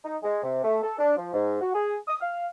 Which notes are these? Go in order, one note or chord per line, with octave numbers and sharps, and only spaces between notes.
D#4
G#3
C3
A3
A4
D4
F3
G#2
F#4
G#4
D#6
F5